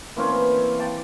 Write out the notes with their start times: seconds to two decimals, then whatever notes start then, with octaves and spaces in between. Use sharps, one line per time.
0.16 E3 A#3 C4 C#4
0.79 G5 A5 D6